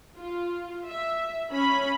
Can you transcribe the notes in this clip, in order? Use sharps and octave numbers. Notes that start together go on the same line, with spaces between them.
F4
E5
C#4 B5